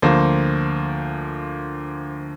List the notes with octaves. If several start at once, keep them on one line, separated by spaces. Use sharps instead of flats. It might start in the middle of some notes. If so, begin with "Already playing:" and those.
D2 F3 A#3 C5